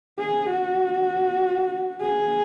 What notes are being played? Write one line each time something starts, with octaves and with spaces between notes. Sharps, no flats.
G#4
F#4
G#4